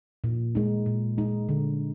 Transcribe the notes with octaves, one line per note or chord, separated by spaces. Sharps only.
A#2
G#3 D#4
A#2
G#3 D#4
D3